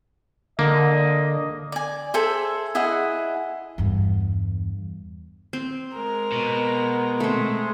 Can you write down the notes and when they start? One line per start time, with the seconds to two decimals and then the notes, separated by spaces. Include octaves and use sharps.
0.59 D3 A#3 D#5
1.72 D5 G#5
2.14 G#4 A4 C5 E5
2.75 E4 G#4 D#5 F#5
3.78 E2 G2
5.53 C4
5.94 G#3 A#4
6.32 B2
7.20 G#3 A3 C4